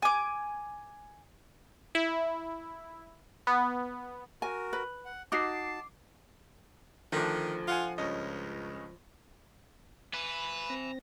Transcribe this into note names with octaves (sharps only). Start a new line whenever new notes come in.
G#5 D6
E4
B3
F#4 A#4 G#5
B4
F#5
D#4 F#4 A5 D6 C7
D2 D#3 F3 A3 D4 A#6
F4 F5 F#5 G#5
C#2 G2 C#4 D#5
B4 G#5 B5
C4 A#6